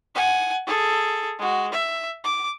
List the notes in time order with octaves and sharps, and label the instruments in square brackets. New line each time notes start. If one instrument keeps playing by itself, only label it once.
[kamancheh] F#5 G#5
G#4 A4
G#3 F#4
E5
D6